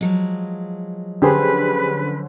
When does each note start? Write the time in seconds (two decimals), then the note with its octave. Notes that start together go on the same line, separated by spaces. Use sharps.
0.01 F3 F#3 G#3
1.22 D3 C#4 G4 G#4 B4 C5